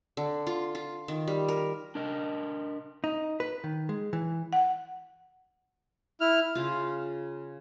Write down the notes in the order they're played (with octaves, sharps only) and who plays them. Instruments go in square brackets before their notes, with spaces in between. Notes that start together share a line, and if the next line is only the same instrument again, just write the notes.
[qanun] D3
F4
F4
D#3
G3
A#4
[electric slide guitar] D4 A#4 D#5
[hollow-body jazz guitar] D#4
B4
D#3
G#3
E3
[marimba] F#5
[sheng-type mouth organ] E4 F6
[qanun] C#3 F4